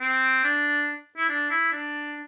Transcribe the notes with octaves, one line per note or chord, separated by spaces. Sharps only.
C4
D4
E4
D4
E4
D4